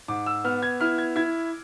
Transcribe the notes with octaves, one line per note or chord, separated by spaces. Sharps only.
G#2 D6
E6
B3 F6
G#6
E4 F6
G#6
E4 G#6